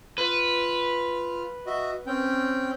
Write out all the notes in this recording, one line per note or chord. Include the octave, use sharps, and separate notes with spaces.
F4 B4 F6
F#4 D#5 E5
C4 C#4 G5